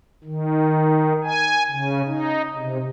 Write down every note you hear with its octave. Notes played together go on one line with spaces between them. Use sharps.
D#3
G#5
C#3
D#4
C3